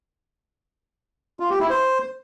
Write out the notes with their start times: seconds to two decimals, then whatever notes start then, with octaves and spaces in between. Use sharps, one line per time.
1.40 F4
1.50 G4
1.60 E4
1.70 C5